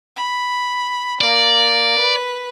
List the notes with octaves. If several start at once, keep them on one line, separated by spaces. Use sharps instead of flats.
B5
A#3 D5
B4